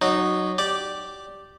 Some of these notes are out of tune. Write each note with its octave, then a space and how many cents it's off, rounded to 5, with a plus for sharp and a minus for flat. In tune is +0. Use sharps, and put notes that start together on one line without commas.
F#3 +0 D#4 -20
G4 -10 D5 +0